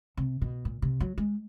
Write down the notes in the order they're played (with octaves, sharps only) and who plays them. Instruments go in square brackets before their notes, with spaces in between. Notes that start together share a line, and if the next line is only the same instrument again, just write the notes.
[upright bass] C3
B2
A#2
C3
F#3
G#3